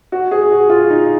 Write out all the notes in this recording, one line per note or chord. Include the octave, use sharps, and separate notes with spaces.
F#4
G#4
F#4
F4
D#4